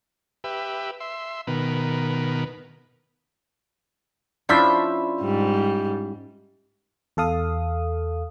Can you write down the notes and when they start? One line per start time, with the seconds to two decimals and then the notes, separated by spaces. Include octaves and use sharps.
0.44 G4 B4 E5
1.00 E5 C6
1.47 B2 D#3 A#4 B4
4.49 F3 C#4 D4 E4 F4 C5 E5 B5
5.21 G#2 G3
7.17 E2 A4 F5 D#6